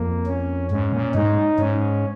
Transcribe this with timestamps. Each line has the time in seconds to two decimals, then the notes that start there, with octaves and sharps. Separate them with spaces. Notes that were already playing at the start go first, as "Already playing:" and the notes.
Already playing: F2 A#3
0.26 C#4
0.70 G#2 C#4
0.93 A#2
1.15 G#2 D#4
1.59 G#2 C#4